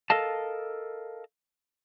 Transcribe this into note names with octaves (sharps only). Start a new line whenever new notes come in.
A4 A#4 D#5 F5 A5